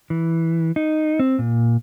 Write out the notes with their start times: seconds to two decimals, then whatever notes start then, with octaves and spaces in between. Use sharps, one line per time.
0.10 E3
0.76 D#4
1.19 C4
1.39 A#2